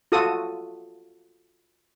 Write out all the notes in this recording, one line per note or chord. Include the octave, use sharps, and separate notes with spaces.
F4 F#4 A4 D#6